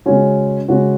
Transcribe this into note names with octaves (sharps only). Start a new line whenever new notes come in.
C#3 G#3 C#4 F#4
C#3 G#3 C#4 F#4